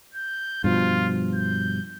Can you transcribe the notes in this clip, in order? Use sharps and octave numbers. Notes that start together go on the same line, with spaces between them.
G6
G2 B2 F3 F4
G6